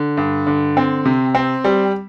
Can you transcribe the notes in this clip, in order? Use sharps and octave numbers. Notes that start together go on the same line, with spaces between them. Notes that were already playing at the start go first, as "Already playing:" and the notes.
Already playing: D3
G2
D3
C4
C3
C4
G3